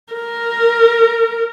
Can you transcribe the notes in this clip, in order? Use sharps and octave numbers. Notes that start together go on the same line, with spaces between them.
A#4